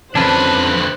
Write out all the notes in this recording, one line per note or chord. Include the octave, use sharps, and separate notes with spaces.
F2 D3 C#4 D4 B4 C5 A5 F#6